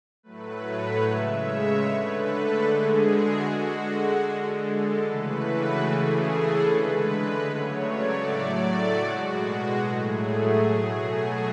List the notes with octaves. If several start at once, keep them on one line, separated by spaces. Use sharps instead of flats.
A2 F#3 A3 B4
C#5
C#3 G#3 E5
C#5
D3 A3 B4
A4
D3 G#3 G#4
F#4
D3 G#3
D3 G#3
A4
C#3 E3 A3 B4
F#4
C#3 E3 A3 G#4
A4
D3 G#3 B4
C#3 F#3 A3 C#5
D5
A2 F#3 A3 D5
F#4
B2 G#3 F#4
A2 F#3 A3 G#4
G#4
B2 F#3 A3 G#4
F#4